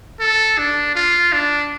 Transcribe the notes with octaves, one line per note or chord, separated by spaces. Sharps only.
A4
D4
F4
D4